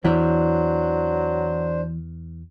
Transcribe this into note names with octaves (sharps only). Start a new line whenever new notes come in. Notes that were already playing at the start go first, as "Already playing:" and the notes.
E2 E3 F#3 D4 E4 C5 D5